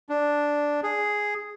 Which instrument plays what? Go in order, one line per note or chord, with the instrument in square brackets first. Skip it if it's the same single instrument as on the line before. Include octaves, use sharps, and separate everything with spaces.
[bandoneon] D4
G#4